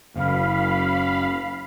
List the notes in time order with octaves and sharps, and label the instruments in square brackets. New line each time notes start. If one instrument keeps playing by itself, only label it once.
[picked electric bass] F#1 [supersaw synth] F5 B5